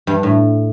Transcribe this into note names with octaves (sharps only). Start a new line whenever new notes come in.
G2
A2